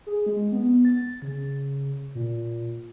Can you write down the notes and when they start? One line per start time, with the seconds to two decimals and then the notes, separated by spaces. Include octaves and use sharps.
0.06 G#4
0.26 G#3
0.52 B3
0.85 A6
1.22 C#3
2.15 A#2